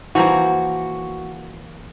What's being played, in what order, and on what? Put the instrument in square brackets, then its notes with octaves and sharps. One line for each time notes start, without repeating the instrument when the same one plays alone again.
[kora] E3 F3 A#3 [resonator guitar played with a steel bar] F#4